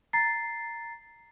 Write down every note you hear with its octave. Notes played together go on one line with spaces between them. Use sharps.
A#5 A6 C7